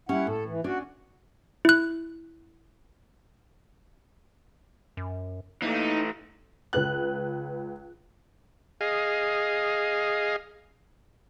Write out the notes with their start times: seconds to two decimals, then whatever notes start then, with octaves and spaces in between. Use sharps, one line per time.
0.09 G3 C#4 E4 F#5
0.27 A2 A4
0.45 E3
0.64 C#4 D4 F#4 D5
1.65 E4 F#6
4.97 F#2
5.62 E3 A3 A#3 D#4
6.73 C#2 B4 F#6
8.81 G#4 D#5 F5